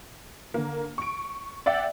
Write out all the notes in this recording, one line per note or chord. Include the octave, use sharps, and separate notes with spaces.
D3 A#3
C#6 D7
D5 E5 F#5 G5